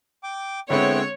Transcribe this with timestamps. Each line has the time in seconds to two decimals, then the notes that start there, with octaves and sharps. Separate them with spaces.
0.23 G5 D6
0.70 D3 G#3 B3 C4 E4 C#5 G5